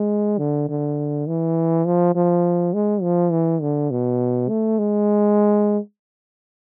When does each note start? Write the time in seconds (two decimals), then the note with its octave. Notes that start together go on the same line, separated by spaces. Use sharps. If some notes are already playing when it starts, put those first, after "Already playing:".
Already playing: G#3
0.38 D3
0.69 D3
1.27 E3
1.85 F3
2.15 F3
2.74 G#3
3.02 F3
3.31 E3
3.61 D3
3.91 B2
4.49 A3
4.78 G#3